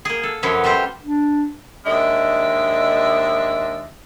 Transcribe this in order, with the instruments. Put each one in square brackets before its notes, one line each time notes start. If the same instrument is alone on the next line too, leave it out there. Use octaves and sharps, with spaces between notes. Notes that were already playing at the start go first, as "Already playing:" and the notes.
[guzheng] A#3 G#4
A4
F#2 F3 F#3 B4 C#5
G3 A3 F4 G4 C5
[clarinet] D4
[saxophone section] D#2 G#3 D4 D#5 E5